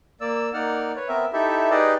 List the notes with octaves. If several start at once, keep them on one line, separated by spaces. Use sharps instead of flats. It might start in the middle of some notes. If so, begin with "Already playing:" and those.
A#3 D5 E6
A#3 D#4 D5 F#5 F6
B4 C#5
B3 C4 A#4 E5
D#4 E4 G4 A4 E5
D#4 G4 G#4 B4 D5 D#5